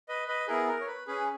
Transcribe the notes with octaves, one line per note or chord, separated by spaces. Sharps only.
B4 D#5
B4 D#5
B3 E4 G#4 A#4
A#4
C#5
B4
C#4 G#4 B4